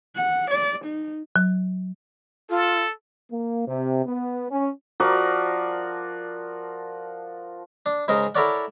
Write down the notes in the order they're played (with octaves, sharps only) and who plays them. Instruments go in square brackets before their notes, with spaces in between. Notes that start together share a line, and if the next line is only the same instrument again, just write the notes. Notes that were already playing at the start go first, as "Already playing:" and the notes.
[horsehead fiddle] F#5
D5
D#4
[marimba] F#3
[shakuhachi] F4 [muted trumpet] A4
[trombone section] A#3
C3
B3
C#4
[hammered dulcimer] F3 F#4 A#4 D5
[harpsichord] D4
G#2 C#3 G#3 A#4
E4 A4 A#4 C#5 D5 F#5